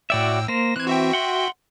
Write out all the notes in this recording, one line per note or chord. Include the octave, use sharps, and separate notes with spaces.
A2 F#4 D5 E5 G5 E6
A#3 C5 A#6
E3 C4 F#6 G#6
F#4 E5 G5
F#5 C6